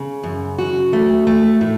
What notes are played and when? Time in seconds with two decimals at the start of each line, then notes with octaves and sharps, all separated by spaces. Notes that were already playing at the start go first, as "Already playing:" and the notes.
Already playing: C#3
0.24 F#2
0.59 F#4
0.93 A3
1.27 A3
1.61 A2